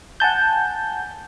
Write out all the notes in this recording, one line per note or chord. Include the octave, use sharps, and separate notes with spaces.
F#5 G#5 A5 G6